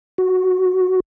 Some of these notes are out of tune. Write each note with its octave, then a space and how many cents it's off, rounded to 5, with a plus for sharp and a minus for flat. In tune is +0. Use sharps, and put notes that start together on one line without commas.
F#4 +0